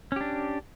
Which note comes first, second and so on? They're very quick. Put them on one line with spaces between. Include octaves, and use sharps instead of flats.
C#4 G4 D4